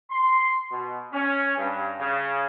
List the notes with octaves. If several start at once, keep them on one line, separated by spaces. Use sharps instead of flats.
C6
B2
C#4
G2
C#3